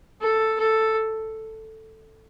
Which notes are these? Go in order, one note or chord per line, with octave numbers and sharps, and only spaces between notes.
A4
A4